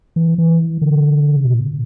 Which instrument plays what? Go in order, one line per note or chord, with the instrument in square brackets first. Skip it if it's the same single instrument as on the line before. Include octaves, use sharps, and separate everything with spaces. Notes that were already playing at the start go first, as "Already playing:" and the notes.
[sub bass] E3
E3
D3
C#3
B2
A#2